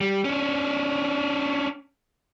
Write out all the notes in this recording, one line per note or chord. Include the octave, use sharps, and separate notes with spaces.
G3
C#4 D4